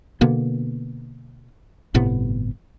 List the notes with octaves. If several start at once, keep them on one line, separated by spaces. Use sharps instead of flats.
B2 D3 A#3 B3
G1 A2 C3 B3